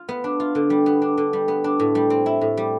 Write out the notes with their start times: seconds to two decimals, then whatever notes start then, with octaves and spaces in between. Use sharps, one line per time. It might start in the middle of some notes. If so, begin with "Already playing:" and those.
Already playing: F4
0.09 B3
0.24 D4
0.40 F4
0.55 D3
0.70 G3
0.86 B3
1.02 D4
1.18 D3
1.33 G3
1.48 B3
1.64 D4
1.80 A2
1.95 G3
2.10 C4
2.26 E4
2.41 A2
2.57 G3